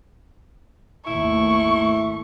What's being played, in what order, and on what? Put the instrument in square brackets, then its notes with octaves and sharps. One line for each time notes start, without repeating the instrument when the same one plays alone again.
[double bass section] G#1 D#2 A3 [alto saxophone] E4 [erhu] C#6